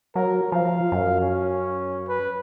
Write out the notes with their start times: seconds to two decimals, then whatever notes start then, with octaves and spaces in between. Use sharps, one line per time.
0.15 F#3 A#4
0.52 F3 F5
0.92 F#2
1.21 C#4
2.08 B4